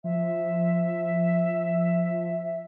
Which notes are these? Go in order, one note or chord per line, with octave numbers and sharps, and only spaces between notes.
F3 E5